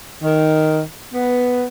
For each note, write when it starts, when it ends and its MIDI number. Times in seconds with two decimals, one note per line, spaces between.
0.22 0.81 51
1.14 1.65 59